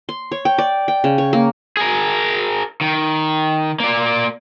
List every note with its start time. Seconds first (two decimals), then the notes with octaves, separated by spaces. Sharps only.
0.09 C6
0.32 C#5
0.45 G5
0.58 D5
0.88 G5
1.04 C#3
1.18 C#5
1.33 A#3
1.77 G#4 A#4
2.81 D#3
3.80 A#3 D5